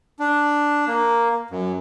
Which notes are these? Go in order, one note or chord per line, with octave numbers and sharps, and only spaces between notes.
D4
A#3
F#2